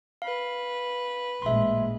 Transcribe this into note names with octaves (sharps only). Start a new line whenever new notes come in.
B4 F5
A1 A#2 G#3 E5 C6